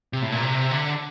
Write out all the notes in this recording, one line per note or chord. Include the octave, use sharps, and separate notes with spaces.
C3
A2
A#2
C3
D3